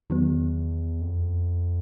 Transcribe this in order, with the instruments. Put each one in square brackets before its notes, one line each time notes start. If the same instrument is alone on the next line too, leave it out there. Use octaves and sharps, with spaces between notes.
[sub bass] E2 [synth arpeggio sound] D#3 F#3 B3
[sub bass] F2